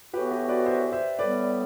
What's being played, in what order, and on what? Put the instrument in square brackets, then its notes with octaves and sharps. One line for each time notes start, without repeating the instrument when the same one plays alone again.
[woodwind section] A2 E3 B3 F#4 [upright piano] G4 B4
[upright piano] G4 B4
B4 D5
C5 E5
C5 E5
[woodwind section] A2 G3 B3 [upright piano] B4 D5